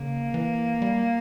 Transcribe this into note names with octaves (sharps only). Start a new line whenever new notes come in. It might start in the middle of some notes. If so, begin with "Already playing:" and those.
Already playing: C#3 A#3
E3
G3